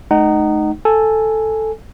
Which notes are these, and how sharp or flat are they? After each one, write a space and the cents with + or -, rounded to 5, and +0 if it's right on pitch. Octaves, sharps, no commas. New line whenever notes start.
A3 -40 D#4 -15 F#5 +30
A4 +0 G#5 +0